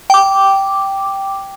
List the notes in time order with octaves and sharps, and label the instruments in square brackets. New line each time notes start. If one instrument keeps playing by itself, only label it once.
[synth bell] G5 D6